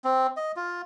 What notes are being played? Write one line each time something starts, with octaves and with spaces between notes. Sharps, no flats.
C4
D#5
F4